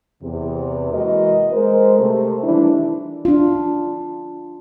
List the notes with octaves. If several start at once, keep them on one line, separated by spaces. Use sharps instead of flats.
E2 C3
E3 G#3 A#3 F#4 A#4 D#5
G#3 A#4 C5
C3 A3
D#3 E3 G3 D4 E4
D4 F4